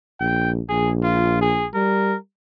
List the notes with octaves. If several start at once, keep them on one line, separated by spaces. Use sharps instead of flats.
A#1 G5
A#1 G#4
F4
G#4
G3 A#4